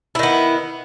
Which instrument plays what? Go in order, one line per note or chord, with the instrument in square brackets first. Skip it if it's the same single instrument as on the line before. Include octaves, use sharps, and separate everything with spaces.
[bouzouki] E4
D#3
B3